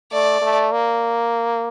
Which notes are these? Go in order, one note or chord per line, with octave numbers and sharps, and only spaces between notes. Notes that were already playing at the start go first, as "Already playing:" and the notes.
A3 D5
A3
A#3